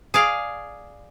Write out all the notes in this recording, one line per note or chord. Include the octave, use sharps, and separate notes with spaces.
G#4 D5 F5